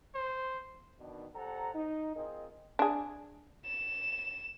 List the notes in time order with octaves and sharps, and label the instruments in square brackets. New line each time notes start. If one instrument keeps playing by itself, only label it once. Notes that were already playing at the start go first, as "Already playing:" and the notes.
[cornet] C5
[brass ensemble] B2 D#3 D4
A#2 G4 A4 C5 F#5 A#5
D#4
C4 F4 G#4 A#4 D#5
[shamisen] D4 G#4
[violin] E7